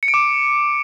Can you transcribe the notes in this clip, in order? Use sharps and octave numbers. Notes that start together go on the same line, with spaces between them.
C#7
D7
D6